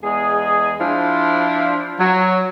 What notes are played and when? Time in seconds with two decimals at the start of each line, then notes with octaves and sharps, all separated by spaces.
0.03 E2 G#3 G#4
0.80 F3 D4 E4 F4 C5
1.99 F#3